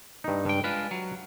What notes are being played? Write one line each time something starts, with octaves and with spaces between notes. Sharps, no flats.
G2 D#4
C#2 G2 G5
G#3 D4 F4 B4
F#3